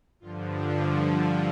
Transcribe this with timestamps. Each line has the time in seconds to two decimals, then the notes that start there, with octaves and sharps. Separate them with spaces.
0.20 G2 D3 F3 F4
0.50 D4